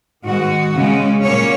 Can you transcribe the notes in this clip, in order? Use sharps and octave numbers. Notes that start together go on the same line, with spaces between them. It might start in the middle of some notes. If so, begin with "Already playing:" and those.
G#2 D#3 G#3 F#4
C#3 G#3 C#4
A#2 F#3 A#3 C#4 C#5